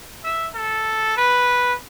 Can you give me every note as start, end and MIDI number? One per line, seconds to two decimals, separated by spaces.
0.24 0.47 76
0.55 1.16 69
1.17 1.73 71